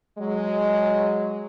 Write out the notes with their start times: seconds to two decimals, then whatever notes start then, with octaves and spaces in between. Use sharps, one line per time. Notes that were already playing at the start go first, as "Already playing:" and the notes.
0.19 F#3 G#3